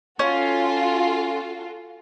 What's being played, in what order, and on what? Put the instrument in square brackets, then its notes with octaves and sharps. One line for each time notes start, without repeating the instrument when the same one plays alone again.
[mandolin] C#4 [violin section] F4 F#4 A4